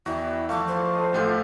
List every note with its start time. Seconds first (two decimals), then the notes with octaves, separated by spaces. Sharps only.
0.06 E2 E4 F#4 D5 G5
0.49 F3 A3 F5 D6
0.67 C5
0.94 A4 D#5
1.13 A1 A3 F4 G4 F#5 G6